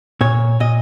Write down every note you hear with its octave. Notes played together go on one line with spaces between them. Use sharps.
A#2 C#5
A#2 D#5